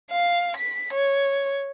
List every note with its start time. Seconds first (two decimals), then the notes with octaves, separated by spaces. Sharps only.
0.11 F5
0.57 B6
0.93 C#5